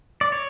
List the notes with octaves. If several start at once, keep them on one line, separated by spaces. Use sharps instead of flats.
D5
C#5